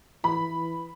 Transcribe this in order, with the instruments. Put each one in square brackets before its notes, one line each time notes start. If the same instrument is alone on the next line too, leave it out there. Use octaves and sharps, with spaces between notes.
[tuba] E3 [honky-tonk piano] B5